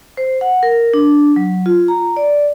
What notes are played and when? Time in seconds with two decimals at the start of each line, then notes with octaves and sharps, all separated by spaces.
0.17 C5
0.41 F#5
0.63 A#4
0.93 D4
1.36 F#3
1.66 F4
1.88 A#5
2.17 D5